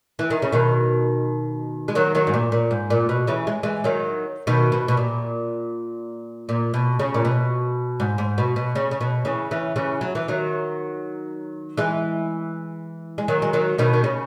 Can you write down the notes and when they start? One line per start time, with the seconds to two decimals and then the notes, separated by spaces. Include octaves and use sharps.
0.19 E3
0.30 D#3
0.42 C#3
0.52 B2 D#3
1.88 G#3
1.95 D#3 F#3
2.15 D#3 F#3
2.27 G#2
2.34 A#2
2.52 A#2
2.71 G#2
2.90 A#2
3.09 B2
3.27 C#3 E3
3.47 G#3
3.63 E3 G#3
3.84 D#3 F#3
4.47 B2 D#3
4.72 B2
4.88 B2
4.97 A#2
6.49 A#2
6.74 B2
6.99 C#3
7.14 A#2
7.25 B2
8.00 G#2
8.18 G#2
8.38 B2
8.56 B2
8.75 C#3
8.91 C#3
9.01 B2
9.25 C#3 E3
9.51 C#3 E3
9.76 C#3 E3
10.01 F#3
10.15 E3
10.28 D#3 F#3
11.77 E3 G#3
13.18 G#3
13.28 D#3 F#3
13.42 G#3
13.53 D#3 F#3
13.78 B2 D#3
13.93 D#3
14.04 C#3